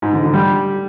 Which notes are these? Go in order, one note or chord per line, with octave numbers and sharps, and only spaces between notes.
G#2
D3
D3
G3